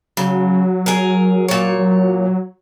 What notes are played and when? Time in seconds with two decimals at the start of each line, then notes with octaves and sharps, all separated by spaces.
0.17 C#3 F#3
0.86 G#4 A#4
1.48 A#2 C#5
1.79 F#3